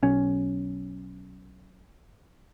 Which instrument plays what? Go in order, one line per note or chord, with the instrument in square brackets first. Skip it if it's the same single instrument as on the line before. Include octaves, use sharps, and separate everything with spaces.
[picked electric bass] B1 C#4